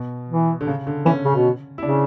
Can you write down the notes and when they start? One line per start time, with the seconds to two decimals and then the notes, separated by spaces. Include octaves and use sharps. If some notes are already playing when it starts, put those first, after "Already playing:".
Already playing: B2
0.29 E3
0.61 D3
0.67 C#3
0.87 D3
1.05 E3 C#4
1.25 C#3
1.35 B2
1.78 E4
1.83 C#3 D4